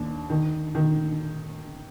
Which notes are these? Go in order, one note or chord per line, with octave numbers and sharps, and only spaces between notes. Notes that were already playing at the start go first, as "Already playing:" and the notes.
Already playing: D#2 D4
D#3
D#3